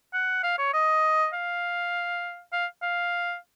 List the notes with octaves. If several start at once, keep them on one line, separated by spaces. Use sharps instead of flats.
F#5
F5
C#5
D#5
F5
F5
F5